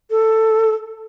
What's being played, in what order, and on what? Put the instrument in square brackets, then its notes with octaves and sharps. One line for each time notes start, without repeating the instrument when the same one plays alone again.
[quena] A4